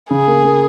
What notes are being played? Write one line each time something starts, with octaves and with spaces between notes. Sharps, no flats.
C#3 G#4
A#3
A#3